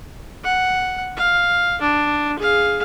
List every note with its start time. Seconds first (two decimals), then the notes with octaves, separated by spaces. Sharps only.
0.44 F#5
1.17 F5
1.81 D4
2.38 G#4 F5